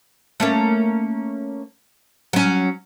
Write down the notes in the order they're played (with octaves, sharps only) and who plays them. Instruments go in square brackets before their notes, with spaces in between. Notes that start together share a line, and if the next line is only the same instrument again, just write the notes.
[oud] A3 A#3 C#4
F#3 C#4